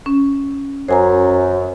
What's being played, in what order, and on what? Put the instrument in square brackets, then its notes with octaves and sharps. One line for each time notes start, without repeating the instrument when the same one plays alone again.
[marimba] C#4
[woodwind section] F#2 [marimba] C5 G#5 A#5